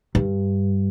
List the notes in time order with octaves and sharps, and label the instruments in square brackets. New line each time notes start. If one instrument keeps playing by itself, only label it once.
[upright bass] G2